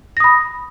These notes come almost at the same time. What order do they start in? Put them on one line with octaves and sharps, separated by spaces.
A#6 D#6 B5